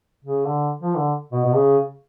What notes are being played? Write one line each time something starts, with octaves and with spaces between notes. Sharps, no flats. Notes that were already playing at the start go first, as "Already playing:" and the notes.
C#3
D3
F3
D3
B2
B2
C#3